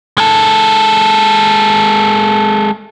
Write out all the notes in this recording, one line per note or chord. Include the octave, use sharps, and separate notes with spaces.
G#3 A4